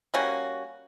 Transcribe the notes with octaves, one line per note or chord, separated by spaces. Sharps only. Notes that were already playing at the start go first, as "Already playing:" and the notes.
G3 A#3 C#4 F#4